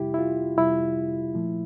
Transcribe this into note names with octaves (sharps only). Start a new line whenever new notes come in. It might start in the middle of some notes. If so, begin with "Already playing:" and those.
Already playing: F2 C3 G3 E4 G4
E4
F4
F2 C3 G3 E4
A#2 F3 A3